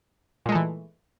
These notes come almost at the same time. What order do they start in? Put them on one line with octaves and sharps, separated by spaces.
A#2 G#3 A3 E3